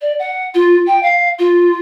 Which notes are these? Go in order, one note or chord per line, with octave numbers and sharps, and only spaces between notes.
D5
F#5
F4
G5
F5
F4